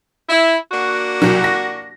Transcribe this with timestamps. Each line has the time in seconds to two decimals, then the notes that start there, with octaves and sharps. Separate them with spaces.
0.29 E4
0.72 A#3 D4 F#4
1.22 C2 F#3
1.44 A#6